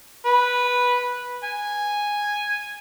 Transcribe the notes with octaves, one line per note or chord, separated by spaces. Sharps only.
B4
G#5